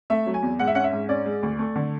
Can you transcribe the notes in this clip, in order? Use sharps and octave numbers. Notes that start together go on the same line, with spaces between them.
A3 E5
F#3
G#5
E2
G#2 F#5
E5
C#4 F#5
E5
G#2
C#4 D5
G#3
D2
A3
D3